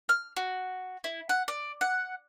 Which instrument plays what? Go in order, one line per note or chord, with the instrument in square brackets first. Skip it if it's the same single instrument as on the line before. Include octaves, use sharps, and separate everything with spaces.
[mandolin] F6
F#4
E4
F#5
D5
F#5